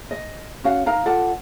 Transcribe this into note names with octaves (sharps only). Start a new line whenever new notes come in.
D#5
C#4 F#4 F5 F#5
D#4 A#4 F5 A#5
F4 A4 D5 F#5